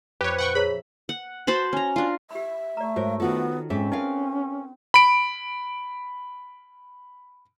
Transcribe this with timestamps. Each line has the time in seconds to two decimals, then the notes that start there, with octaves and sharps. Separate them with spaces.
0.21 F2 G4 B4 C#5
0.38 A#2 F#5 G5 C#6
0.55 G#4 C#5 E5 A#5 B5
1.09 F#5
1.47 F#4 C5 A5 B5
1.73 C#4 A#5
1.96 D4 F4
2.31 G4 E5 B5
2.77 A3 D5 A#5
2.96 G#2 F#4 A#4 C5 C#5
3.20 D#3 B3 F4 F#4 A4
3.70 G#2 C4 C#4 G#4 A4 E5 G#5
3.92 D#4 A#4 B4 E5 F5 A5
4.94 B5 D7